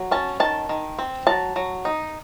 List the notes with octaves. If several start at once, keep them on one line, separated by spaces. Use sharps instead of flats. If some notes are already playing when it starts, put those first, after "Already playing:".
Already playing: F#3
C#4 A5
D#3 A5
D#3
C4
F#3 A5
F#3
D#4